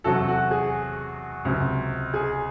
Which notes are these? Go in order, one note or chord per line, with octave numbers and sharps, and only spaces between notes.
E2 C3 F#3 F#4 A4
F#4
G#4
C#2 C3 F#3
G#4